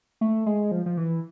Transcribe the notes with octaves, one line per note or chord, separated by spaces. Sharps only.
A3
G#3
F3
F3
E3